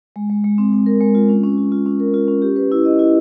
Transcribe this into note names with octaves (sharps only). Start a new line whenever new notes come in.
G#3
G#3
G#3
C4
C4
A#4
G#3
F4
C#4
C#4
F4
F4
C#4
A#4
F4
C#4
G4
B4
E4
D#5
E4